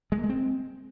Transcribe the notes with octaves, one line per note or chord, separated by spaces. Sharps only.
G#3
A#3
G#3
C4